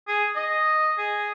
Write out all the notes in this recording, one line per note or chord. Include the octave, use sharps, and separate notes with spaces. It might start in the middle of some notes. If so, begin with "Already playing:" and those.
G#4
D#5
G#4